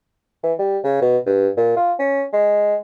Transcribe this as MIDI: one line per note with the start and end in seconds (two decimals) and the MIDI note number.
0.43 0.53 52
0.59 0.78 55
0.84 0.98 49
1.02 1.18 47
1.26 1.49 43
1.57 1.74 46
1.77 1.93 65
1.99 2.24 61
2.33 2.75 56